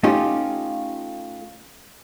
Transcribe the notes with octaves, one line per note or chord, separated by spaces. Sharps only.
A3 C#4 D#4 F4 G4